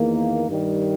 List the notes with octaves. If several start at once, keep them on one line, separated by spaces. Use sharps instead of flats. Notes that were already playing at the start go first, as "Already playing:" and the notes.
Already playing: E2 D#3 A#3
G2 D#3 G3